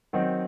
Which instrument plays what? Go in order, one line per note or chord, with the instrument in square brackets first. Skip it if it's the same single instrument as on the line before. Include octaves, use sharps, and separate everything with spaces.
[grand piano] D#3 F#3 C4 D#4